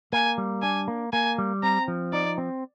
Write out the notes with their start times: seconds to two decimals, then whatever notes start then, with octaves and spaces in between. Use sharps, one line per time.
0.13 A#3 G#5
0.38 G3
0.62 D4 G#5
0.88 A#3
1.13 A#3 G#5
1.38 G3
1.63 C4 A#5
1.88 F3
2.13 D#4 D5
2.38 C4